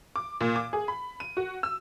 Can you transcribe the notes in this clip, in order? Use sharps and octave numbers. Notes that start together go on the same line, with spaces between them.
D6
A#2
D6
G#4
B5
D#7
F#4
E6